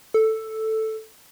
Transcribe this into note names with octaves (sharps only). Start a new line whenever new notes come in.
A4